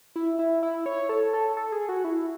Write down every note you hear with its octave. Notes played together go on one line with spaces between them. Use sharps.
E4
E4
E4
C#5
A4
A4
A4
G#4
F#4
E4